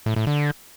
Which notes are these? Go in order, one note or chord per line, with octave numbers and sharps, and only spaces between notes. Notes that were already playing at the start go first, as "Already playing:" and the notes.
A2
A2
D3